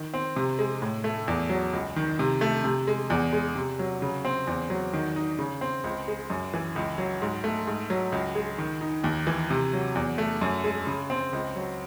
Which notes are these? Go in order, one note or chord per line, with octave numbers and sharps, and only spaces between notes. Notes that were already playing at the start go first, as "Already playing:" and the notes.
Already playing: D#3
C4
C3
G#3
A2
A3
E2
F#3
C#2
D#3
C3
A3
C3
G#3
E2
G#3
C3
F#3
C#3
C4
E2
F#3
D#3
D#4
C#3
C4
C#2
G#3
F#2
E3
C#2
F#3
G#2
A3
G#2
F#3
C#2
G#3
D#3
D#4
D#2
E3
C3
F#3
E2
A3
F#2
G#3
C#3
C4
C#2
F#3